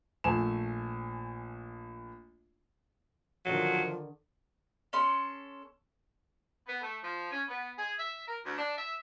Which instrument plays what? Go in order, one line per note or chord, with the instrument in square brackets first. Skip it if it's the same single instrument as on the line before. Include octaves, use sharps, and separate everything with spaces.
[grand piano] A#1 A3 G#5 E7
[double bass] D3 D#3 [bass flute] F3 [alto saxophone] F#3
[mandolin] C#4 A4 C6
[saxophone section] B3
A3
F3
C#4
B3
G#4
E5
A#4
D2
D4
E5